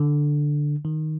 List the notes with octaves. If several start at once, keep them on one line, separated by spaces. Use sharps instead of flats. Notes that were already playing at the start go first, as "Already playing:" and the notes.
Already playing: D3
D#3